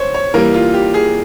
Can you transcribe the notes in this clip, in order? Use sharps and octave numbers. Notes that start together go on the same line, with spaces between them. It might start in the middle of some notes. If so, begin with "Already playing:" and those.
Already playing: C5 C#5
C#5
E3 G3 A#3 A#4
F4
G4
G#4